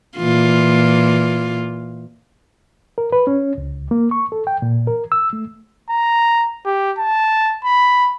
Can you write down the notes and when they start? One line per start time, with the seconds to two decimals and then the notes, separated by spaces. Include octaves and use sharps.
0.18 A#2 E3 F4
2.98 A#4
3.12 B4
3.27 C#4
3.58 C#2
3.91 A#3
4.11 C#6
4.32 A4
4.47 G5
4.62 A#2
4.87 A#4
5.12 E6
5.33 A3
5.89 A#5
6.65 G4
6.98 A5
7.64 B5